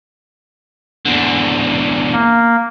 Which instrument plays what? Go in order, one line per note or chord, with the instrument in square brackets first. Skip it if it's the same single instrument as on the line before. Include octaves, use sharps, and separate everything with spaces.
[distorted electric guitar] E2 D3
[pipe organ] A#3